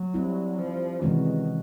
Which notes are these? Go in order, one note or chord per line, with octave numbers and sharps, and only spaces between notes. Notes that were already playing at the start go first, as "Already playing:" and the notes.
Already playing: F#3
G3 C4 E4
F3
C3 D#3 E3 G#3 C#4 F#4